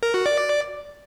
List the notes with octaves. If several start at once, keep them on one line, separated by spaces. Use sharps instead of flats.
A#4
F#4
D5